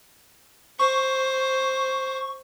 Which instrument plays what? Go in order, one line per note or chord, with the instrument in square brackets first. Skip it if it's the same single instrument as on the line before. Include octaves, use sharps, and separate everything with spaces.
[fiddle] C5 [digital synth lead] C#6